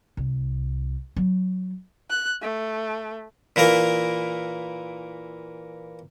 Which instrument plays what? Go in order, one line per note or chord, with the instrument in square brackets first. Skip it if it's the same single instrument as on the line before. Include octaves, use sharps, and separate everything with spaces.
[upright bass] C2
F#3
[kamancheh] F#6
A3
[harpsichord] A#2 E3 A#3 A#4